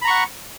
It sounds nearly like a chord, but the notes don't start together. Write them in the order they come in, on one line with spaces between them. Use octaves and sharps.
B5 A#5 C#6 F#5